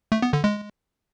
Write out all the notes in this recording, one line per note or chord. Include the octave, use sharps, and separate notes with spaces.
A3
B3
D3
G#3